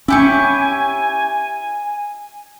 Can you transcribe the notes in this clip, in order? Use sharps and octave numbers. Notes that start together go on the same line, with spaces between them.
C#4 E4 G4 G#5 C#6